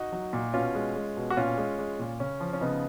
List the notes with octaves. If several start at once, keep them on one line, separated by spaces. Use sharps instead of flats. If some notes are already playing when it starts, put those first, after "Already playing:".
Already playing: D#4 F#4
F#3
A#2
B2 C#4 F4
G#3
G#3
B2
F#4
A#2 C#4 F4
G#3
G#3
A#2
C#3 C#4
F3
C#4
C#3 B3 D#4